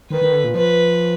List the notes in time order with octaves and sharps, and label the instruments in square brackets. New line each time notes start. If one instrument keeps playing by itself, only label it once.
[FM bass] D#3 [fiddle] B4
[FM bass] D#3
D3
A#2
[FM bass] F3 [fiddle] B4